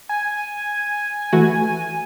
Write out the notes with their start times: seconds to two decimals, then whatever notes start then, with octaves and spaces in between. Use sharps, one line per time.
0.09 G#5
1.33 E3 A3 F#4